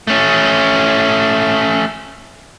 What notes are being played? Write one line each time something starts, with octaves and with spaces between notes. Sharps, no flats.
A3 C#4